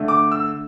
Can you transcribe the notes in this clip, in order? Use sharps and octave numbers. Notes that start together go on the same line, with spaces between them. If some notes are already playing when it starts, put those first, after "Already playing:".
Already playing: D3 A3
D6
E6